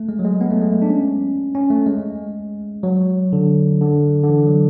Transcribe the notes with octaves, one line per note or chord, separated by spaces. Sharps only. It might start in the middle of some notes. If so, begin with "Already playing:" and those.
Already playing: A3
G#3
F#3
G#3
B3
A3
G#3
A3
D4
C#4
C#4
A3
G#3
F#3
D3
D3
D3
E3
F#3